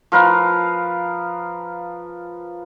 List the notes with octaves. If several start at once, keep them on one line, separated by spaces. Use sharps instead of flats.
F3 A#4 B4 F5